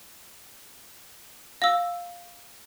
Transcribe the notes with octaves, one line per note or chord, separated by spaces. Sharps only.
F5 E6